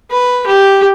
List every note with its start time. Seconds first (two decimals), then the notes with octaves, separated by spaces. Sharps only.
0.11 B4
0.47 G4